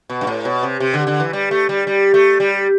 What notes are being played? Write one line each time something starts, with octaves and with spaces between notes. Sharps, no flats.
B2
G2
A2
B2
C3
C3
D3
D3
E3
G3
A3
G3
G3
A3
G3